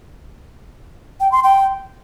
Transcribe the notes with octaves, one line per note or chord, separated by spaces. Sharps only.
G5
C6
G5